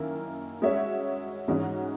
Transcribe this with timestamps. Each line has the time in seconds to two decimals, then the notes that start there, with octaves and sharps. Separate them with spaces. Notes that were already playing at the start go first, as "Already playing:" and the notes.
Already playing: F#2 D#3 A#3 E4 A#4
0.62 G#3 C#4 F#4 C#5 E5
1.48 G#2 E3 G#3 C#4 F#4